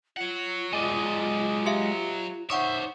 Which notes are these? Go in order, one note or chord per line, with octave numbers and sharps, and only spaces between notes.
F4 C#5 F#5
F#3 G#3 D5 D#5
G4 E5 F5
D#4 C5 C#5 E5 F#5 C#6 D#6